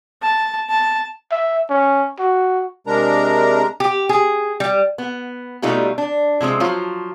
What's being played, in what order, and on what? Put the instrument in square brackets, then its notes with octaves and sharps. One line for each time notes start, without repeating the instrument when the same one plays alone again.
[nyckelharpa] A5
A5
[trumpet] E5
C#4
F#4
[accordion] C3 G#3 D4 A#4 A#5
[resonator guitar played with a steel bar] G4
G#4
G3
B3
B2 G3 A3 D#4 F4 G4
D4
C3 F3 G#3 C4
F3 F#3 F4